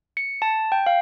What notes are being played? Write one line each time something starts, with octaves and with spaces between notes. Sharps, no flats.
C#7
A5
G5
F5